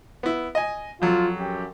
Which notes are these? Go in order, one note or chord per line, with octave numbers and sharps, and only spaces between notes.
B3 E4
D#5 G#5
F2 F#3 F4
F#2 G4